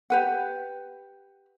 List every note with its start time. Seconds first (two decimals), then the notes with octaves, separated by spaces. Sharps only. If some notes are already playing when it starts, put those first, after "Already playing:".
0.10 G4 B4 F#5